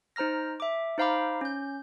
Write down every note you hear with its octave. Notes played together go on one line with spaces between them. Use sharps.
D#4 C5 A#5 F6 A#6
E5 D6
D#4 C5 F5 A#5 B5 D6
C#4 G6